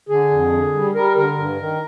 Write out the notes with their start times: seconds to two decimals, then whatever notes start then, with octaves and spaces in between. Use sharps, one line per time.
0.09 D3 G#4
0.31 F2
0.52 D3
0.74 G3
0.95 G3 A#4
1.17 D3 A#4
1.38 G2
1.59 D#3